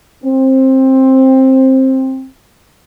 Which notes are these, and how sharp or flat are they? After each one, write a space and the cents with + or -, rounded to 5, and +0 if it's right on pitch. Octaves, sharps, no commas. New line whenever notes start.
C4 +15